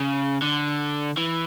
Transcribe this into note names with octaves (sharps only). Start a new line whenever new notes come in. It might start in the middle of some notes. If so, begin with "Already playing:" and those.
Already playing: C#3
D3
E3